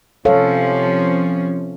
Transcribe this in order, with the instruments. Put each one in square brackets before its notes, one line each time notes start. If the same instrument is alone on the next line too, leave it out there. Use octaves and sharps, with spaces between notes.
[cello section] C3 F3 C#4 [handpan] A4 C#5 F5